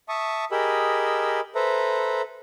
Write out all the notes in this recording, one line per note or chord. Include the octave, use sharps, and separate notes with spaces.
E5 A5 C#6 D#6
G4 G#4 A#4 D#5 B5 E6
A4 B4 C5 E5 A#5